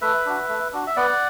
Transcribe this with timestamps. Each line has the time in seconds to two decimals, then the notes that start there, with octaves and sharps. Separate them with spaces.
0.01 A3 B4 E5
0.26 D4 F#4
0.49 A3
0.73 D4 F#4
0.87 E5
0.96 B3 D5 F#5